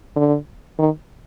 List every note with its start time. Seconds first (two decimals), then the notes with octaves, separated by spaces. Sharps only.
0.16 D3
0.79 D#3